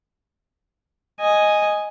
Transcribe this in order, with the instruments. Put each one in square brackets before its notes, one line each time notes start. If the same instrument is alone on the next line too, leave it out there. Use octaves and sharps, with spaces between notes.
[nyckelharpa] D#5 G#5